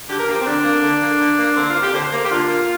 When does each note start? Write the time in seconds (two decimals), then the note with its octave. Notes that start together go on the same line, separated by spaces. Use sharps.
0.09 D3 G4
0.19 A#4
0.28 F3 A#3 G4
0.40 C4
0.46 D3 D4
0.64 A#3
0.84 D3
1.01 A#3
1.20 D3
1.39 A#3
1.56 D3 C4
1.69 F4
1.76 A#3
1.82 G4
1.93 D3 C5
2.12 A#3
2.25 G4
2.31 D3 F4
2.49 A#3